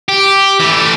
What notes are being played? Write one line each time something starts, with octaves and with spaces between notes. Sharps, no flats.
G4
E3 A3